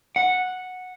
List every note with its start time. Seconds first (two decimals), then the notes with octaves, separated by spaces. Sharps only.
0.16 F#5